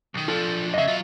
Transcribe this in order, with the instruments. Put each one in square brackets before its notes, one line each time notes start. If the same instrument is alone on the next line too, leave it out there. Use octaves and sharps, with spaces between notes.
[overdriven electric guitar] B1 D#3
[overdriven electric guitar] F3 D4 [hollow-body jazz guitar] F4 A4
[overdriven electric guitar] F2 C#3 [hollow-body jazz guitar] D#5 E5
[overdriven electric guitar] F#3 F4